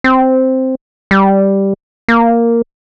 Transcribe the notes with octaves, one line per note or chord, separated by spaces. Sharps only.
C4
G3
A#3